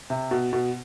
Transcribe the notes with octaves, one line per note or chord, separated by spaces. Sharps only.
C3
B2
B2